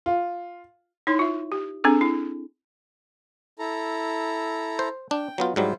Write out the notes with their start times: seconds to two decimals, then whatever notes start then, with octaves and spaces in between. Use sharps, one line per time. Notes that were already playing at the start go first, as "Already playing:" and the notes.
0.06 F4
1.07 D#4 E4 C#5 C6
1.19 F4 E5
1.52 G4
1.84 C4 D4 G#4 A4
2.01 E4
3.59 E4 A4 A#5
4.79 C5
5.11 D4 G5
5.38 F#3 B3 F4
5.56 G#2 F#3 G3 E4 F4 C5